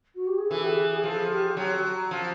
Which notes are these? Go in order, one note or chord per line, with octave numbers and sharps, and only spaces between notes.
F#4
G4
G#4
E3 A4
G4
G#4
G#4
G#4
F3 A4
G4
F#3
F3